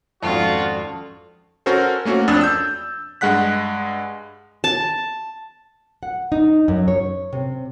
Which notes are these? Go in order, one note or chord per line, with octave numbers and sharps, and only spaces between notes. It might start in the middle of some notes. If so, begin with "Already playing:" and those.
G#1 F2 C#4 F4 F#4 A4 D5
C#4 F#4 A4 A#4 C5
A3 A#3 C#4 F#4
F2 D4 D#6 E6 A6
E6 G6
G2 G#3 F#5 F#6 B6
A5
F#5
D#4
F#2
C#5
C3